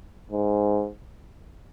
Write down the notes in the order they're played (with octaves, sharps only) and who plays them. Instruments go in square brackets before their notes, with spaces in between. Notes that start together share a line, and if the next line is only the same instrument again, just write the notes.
[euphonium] G#2